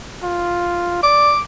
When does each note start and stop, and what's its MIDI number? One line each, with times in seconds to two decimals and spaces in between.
0.23 1.02 65
1.03 1.33 74
1.03 1.40 86